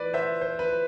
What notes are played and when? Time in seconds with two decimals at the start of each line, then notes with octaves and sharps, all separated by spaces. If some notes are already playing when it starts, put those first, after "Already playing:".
Already playing: E3 B4 D5
0.14 C5 E5
0.41 C5
0.59 B4